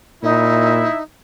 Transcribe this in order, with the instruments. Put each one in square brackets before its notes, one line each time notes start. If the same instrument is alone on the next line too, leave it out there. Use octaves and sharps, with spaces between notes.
[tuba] A#2 [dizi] D#4 [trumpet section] E4 E5